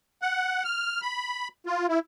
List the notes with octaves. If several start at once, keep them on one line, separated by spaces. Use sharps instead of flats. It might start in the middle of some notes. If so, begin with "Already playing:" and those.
F#5
F6
B5
F4
E4